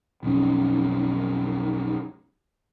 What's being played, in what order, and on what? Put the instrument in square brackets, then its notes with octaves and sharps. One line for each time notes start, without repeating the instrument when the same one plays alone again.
[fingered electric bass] B1 F2 G3 C#4